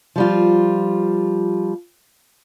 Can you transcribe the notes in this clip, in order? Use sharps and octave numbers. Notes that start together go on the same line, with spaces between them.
F3 G3 F4